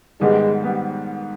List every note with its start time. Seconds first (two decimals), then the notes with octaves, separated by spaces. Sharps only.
0.21 G#2 D#3 G3 G#3 B3
0.64 G3 B3